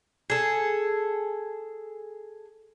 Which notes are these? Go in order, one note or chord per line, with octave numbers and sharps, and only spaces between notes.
G#4 A4